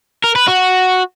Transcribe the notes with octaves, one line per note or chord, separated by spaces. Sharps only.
A#4
B4
F#4